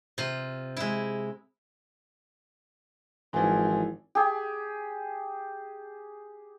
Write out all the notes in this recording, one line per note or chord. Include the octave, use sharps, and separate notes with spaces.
C3 F4
G#3 E4
G#1 E3 F3 D#4 E4 F#5 G#5 C6
G4 G#4